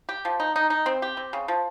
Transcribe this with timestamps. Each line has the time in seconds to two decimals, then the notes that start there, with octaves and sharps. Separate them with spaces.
0.09 G4
0.25 F3
0.40 D#4
0.56 D#4
0.70 D#4
0.86 C4
1.02 G4
1.17 C4
1.33 C#3
1.48 F3